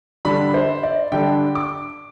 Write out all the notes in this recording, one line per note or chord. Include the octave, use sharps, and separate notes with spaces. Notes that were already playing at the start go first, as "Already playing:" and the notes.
D3 G3 D4 B5
C5
D5
D3 G3 D4 G5
D6